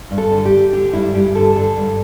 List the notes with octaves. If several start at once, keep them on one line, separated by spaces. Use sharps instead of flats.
G2
A4
D3
G4
D3
D3 G4
G2 E4
G2 G4
D3 A4
D3 A4
G2